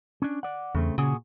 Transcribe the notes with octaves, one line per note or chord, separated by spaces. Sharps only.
C#4 D4
D5 F#5
E2 C#3 A3 C4
A#2 C#3 F#4 G#4